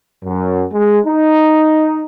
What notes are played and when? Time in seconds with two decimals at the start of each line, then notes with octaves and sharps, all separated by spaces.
0.23 F#2
0.71 G#3
1.06 D#4